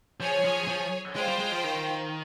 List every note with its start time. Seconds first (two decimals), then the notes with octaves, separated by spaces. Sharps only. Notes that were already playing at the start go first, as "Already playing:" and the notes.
0.20 F3 G#4 C#5 G#5
0.44 F3
0.68 F3
1.16 G#3 F4 C5 G5
1.28 G3
1.40 G#3
1.52 F3
1.64 D#3